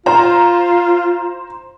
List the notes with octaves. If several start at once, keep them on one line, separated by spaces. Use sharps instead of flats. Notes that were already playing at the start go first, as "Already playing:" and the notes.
F4 C5 A#5